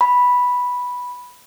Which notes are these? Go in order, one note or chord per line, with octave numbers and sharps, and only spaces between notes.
B5